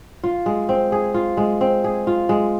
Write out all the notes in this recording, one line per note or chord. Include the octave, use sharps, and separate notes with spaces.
F4
G#3
C4
G#4
F4
G#3
C4
G#4
F4
G#3